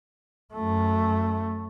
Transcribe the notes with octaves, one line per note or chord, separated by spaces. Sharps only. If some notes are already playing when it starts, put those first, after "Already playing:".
F#2 A3